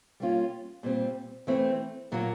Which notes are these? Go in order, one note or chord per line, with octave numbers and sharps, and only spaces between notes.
G3 A#3 C#4 F4
A#2 G3 C4
E3 A3 C4
A#2 F#3 A#3